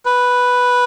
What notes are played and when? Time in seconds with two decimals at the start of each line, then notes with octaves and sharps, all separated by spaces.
0.06 B4